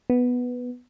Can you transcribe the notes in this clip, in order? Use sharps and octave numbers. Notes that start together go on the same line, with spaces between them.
B3